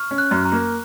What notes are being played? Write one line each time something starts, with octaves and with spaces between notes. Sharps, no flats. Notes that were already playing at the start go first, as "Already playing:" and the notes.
Already playing: C#6 F6
C#4
F#6
F#2
A#5
A#3